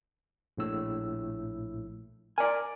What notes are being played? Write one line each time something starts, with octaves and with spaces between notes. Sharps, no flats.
A#1 A2 E6
A#4 D5 G#5